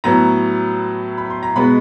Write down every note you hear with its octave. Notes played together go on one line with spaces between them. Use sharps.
A2 F#3 B3 A#5
B5
C6
A#5
B2 G#3 B3 B5